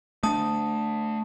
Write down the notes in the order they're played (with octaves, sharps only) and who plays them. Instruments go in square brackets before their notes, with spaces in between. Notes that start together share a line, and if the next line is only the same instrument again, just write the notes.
[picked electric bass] A3 C#4 D4 [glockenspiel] A5 D#6